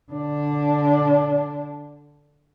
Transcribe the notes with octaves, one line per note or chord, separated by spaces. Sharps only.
D3 D4